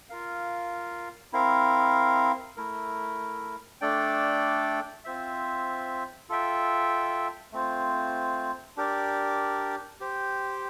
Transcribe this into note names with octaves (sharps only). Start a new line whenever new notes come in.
F4 A#4 F5
C4 E4 A#4 F5
A3 E4 A#4
A3 D4 A4 D5 G5
C4 F4 C5 E5
F4 A4 E5 G5
A3 C4 F4 C5
D4 G4 A#4 D5
G4 C5 G5